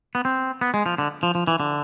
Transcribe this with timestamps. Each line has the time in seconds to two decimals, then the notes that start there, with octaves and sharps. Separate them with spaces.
0.15 B3
0.25 C4
0.61 B3
0.74 G#3
0.86 F3
0.98 D3
1.23 F3
1.35 F3
1.47 E3
1.60 D3